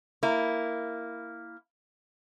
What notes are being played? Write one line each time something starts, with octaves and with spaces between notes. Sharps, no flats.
A#3 E4